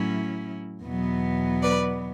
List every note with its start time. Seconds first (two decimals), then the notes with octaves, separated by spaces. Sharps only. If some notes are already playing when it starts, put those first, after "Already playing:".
Already playing: A2 F#3 C#4 E4
0.85 E2 B2 F#3 B3
1.63 B4 D5